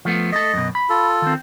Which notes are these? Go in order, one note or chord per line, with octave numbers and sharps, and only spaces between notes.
F3 A3 B3
A3 A4 D#5
F#2 B2
B5
F4 A4
D#3 C4